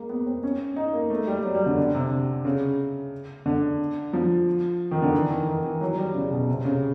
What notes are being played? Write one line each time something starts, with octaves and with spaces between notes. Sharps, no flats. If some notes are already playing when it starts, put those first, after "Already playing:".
Already playing: G#3 A#3
B3
C4
C#4
D#4
A#3
A3
G3
F#3
G3
D3
D3
C3
C#3
D3
F3
D#3
D3
E3
D#3
D#3
E3
F#3
G3
C#3
B2
C3
C#3